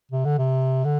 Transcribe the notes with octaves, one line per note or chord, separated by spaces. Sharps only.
C3
D3
C3
D3